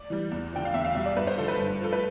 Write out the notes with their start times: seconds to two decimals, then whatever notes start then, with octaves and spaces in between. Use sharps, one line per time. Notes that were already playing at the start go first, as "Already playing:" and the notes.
Already playing: D5
0.10 E3 G3
0.31 E2
0.53 D3 F3 G5
0.65 F5
0.74 E2 E5
0.85 F5
0.95 B2 G3 E5
1.06 D5
1.16 G2 B4
1.27 C5
1.38 D3 F3 A4
1.48 B4
1.59 G2
1.81 F3 A4
1.93 B4